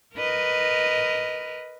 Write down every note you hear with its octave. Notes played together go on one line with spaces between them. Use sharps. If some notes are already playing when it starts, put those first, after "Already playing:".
A#4 B4 D#5